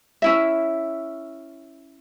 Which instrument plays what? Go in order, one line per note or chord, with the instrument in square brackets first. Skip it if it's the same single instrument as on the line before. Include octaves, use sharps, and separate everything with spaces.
[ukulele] C#4 E4 E5